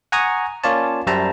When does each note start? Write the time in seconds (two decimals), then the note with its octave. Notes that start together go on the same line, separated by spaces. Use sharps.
0.12 F#5 G#5 A#5 C#6 D#6
0.64 A#3 C#4 F4 C#5 D5 A5
1.07 F#2 G3 C5 E5 A5 A#5